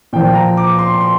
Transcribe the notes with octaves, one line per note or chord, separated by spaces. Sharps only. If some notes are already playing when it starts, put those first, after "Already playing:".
A#2 F3 G5
A#5
D6
C6
C6